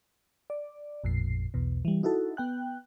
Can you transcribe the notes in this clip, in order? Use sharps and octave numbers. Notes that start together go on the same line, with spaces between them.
D5
A1 F2 A#2 C7
B1 E2 B2
E3 G3
D#4 E4 F#4 A4
B3 G5 F#6